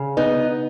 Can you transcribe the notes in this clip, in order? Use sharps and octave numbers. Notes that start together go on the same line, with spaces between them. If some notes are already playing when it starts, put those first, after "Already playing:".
Already playing: C#3
B3 D#4